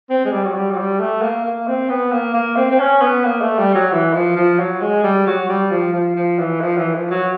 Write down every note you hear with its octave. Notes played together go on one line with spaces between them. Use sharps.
C4
G#3
G3
F#3
G3
F#3
G3
A3
A#3
A#3
C4
B3
A#3
A#3
C4
C4
C#4
B3
A#3
A3
G3
F#3
E3
F3
F3
F#3
G#3
G3
F#3
G3
F3
F3
F3
E3
F3
E3
F3
F#3